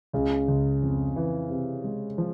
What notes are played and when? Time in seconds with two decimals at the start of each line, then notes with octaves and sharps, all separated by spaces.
0.13 C#2 C#3
0.48 C#2
0.82 F2
1.16 E3
1.50 C3
1.84 G#3
2.18 F3